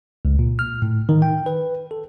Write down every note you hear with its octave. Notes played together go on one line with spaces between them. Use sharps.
C#2
A#2
F6
A2
D#3
G5
B4
A4